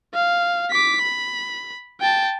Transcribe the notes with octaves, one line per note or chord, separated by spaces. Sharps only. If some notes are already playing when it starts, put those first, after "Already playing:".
F5
D6 B6
B5
G5 A5